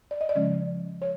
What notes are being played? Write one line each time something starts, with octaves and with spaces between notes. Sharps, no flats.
D5
D#5
D5
C#3 F3 G#3 C#4
C#5